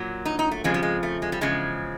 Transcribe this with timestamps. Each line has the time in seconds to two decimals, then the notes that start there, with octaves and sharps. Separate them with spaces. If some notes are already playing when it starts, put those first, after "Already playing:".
Already playing: A#2 F#3
0.25 D#4
0.39 D#4
0.51 A3
0.64 F2 C#3 F3 G#3
0.74 G3
0.83 G#3
1.03 A3
1.22 G#3
1.32 G3
1.41 E2 C#3 F3 G#3